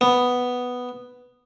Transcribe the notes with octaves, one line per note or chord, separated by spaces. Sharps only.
B3